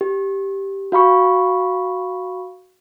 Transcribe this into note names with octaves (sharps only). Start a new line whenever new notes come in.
G4
F#4 F5 B5 C#6